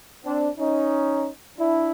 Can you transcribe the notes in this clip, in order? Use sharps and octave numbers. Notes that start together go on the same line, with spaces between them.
C4 D4
C#4 D#4
D4 E4